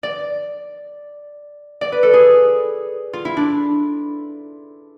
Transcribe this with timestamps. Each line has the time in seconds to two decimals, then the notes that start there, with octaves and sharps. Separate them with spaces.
0.03 D5
1.81 D5
1.92 B4
2.03 A4
2.13 G#4
3.13 F4
3.25 E4
3.37 D4